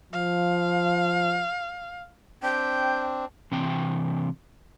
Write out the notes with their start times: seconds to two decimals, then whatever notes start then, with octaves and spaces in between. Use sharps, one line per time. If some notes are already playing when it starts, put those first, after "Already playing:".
0.13 F3 F5
2.43 C4 D4 G5
3.52 C3 E3 C4 G5